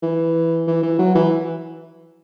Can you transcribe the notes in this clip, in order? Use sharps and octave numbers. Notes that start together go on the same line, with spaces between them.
E3
E3
E3
F#3
E3